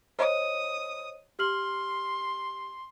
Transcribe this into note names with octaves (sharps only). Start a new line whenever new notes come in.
C5 C#5 D#5 D#6
G4 C6 F6 F#7